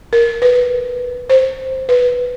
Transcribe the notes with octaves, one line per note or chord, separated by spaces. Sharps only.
A#4
B4
C5
B4